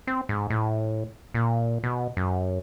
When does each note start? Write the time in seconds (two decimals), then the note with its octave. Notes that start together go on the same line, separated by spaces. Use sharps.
0.07 C4
0.29 G#2
0.50 A2
1.34 A#2
1.84 B2
2.17 F#2